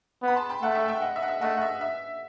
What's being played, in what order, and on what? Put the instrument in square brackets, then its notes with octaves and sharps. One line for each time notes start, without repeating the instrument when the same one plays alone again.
[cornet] B3
[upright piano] B5
A5 C6
G5 B5
[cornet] A3 [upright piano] F#5 A5
[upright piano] E5 G5
E5 G5
D#5 F#5
E5
F#5
E5
[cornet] A3 [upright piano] D#5 F#5
[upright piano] F#5
E5
E5